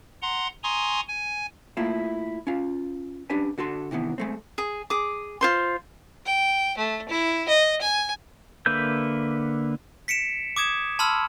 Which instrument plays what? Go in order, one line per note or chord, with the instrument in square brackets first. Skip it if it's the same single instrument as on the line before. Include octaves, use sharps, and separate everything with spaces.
[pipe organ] F#5 A#5 C6
G#5 A#5 C6 C#6 D#6
G#5
[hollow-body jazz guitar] A3 A#3 E4 F4 E5
C#4 F4
C#4 D4 G4 B4 G#5
D3 F#4 A4 C6
C3 D#3 E3 B3
G#3 A3 C4
[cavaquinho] G#4
G#4 D6
F4 C5 C6
[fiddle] G5
A3
E4
D#5
G#5
[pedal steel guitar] D3 A#3 B4 E5 G6
[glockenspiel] B6 C#7 D7 E7
D6 D#6 G#6 E7
A5 B5 C6 E6 F6